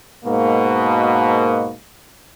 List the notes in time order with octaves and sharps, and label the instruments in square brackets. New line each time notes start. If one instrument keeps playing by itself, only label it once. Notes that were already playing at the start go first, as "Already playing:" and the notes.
[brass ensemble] G#2 B2 A#3